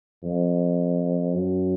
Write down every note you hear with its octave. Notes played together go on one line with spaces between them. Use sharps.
F2
F#2